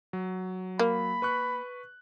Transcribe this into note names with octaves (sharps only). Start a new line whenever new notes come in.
F#3
A#3 B5
B4 C#6 F#6